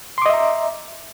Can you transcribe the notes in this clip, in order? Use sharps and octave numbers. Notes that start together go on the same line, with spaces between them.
D#5 E5 A#5 C6 D6